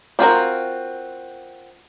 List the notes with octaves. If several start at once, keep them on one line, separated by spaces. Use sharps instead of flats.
C4 F4 F#4 A#4